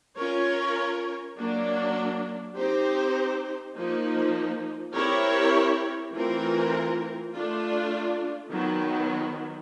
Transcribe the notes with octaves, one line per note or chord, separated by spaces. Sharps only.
C#4 F4 A#4 C#5
F#3 A#3 D4
C4 D#4 G4 C5
F3 A#3 D#4
C4 E4 G4 A#4 C#5
E3 A3 C4 F4 A#4
A3 D4 F4
D#3 F#3 B3